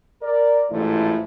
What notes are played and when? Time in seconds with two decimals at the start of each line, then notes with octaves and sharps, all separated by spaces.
0.22 A#4 D5
0.72 A1 G#2 F3 A3 E4